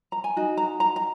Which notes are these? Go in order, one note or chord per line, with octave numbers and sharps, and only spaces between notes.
A#5
G#5
D#4 F#4
A#5
A#5
A#5